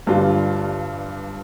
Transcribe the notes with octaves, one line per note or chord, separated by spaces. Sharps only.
G1 G2 G3 F4